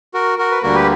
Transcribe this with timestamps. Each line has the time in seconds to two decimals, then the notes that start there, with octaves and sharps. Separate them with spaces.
0.14 F#4 A#4
0.38 F#4 A#4
0.51 B4
0.63 D2 D3 G3 A#3 F#4 A#4
0.74 G4 B4